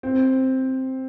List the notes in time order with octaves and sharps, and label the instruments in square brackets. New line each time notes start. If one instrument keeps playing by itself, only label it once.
[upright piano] C4